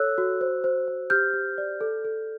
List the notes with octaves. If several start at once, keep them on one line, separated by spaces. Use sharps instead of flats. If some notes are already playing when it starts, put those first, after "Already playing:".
Already playing: A4 C#5 E6 F#6
F#4
C5
C5
C5
G4 F6 G6
G4
D5
A4
A4